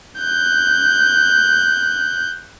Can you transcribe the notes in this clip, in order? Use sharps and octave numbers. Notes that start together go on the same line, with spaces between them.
F#6 G6